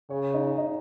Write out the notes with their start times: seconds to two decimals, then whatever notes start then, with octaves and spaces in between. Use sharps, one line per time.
0.10 C#3 C#5
0.34 D#4
0.58 D#4